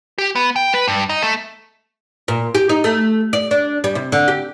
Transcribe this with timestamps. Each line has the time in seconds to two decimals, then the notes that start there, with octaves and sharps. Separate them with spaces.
0.18 G4
0.35 B3
0.56 G5
0.74 B4
0.88 G2
1.09 D#4
1.23 A3
2.28 A#2
2.55 G4
2.69 D#4
2.84 A3
3.33 D5
3.51 D4
3.84 G3
3.95 C3
4.12 D3
4.28 G4